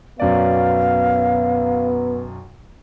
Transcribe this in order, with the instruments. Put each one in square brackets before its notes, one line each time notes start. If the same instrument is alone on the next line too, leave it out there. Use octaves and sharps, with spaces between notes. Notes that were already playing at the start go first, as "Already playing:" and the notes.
[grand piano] B1 F#2 D5 [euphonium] B3 [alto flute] F5